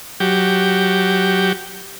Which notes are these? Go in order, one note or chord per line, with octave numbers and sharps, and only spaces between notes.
F#3 G4